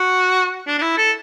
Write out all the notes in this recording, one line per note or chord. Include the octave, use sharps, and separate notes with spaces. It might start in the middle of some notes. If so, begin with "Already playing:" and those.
Already playing: F#4
D4
D4
E4
A4